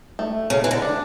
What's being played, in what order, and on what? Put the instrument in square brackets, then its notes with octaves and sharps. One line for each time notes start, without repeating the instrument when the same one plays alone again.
[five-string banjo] A3
[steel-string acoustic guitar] C#3 [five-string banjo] A3
[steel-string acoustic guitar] E3
D3
[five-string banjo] D4